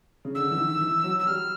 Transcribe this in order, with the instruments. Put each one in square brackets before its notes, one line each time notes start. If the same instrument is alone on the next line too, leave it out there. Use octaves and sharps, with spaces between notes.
[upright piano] C#3
[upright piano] D3 [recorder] E6
[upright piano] E3
D#3
E3
F#3
[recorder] E6
[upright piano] G3 [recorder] F6